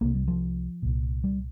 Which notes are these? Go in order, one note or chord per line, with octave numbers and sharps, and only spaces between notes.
C2 C3 A#3
G3
F3
C2 A#2
G3